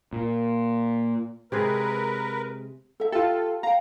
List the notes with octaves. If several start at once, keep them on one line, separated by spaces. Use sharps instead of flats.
A#2
C3 G#3 G#4 A#4 B4
A4 E5
F4 G4 A4
F5 G5 A#5